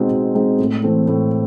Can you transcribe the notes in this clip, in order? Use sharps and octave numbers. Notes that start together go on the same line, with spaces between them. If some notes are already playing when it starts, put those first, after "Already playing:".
Already playing: B2 G#3 C4 D#4
B2
G#3 C4 D#4
A2
E3 A3 C4
A2